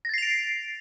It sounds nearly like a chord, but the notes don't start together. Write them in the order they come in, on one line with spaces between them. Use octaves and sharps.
A#6 A6 C7 F7 D7